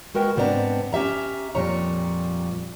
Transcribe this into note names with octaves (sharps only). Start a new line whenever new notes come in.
G#3 F#4 A#4 B4 G5
G#2 B3 C4 D4 B4 A#5
C#4 G4 E5 A#5
F2 A#2 G3 C#5 A#5